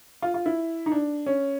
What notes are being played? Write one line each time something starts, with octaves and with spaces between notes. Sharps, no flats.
F4
F4
E4
D#4
D4
C#4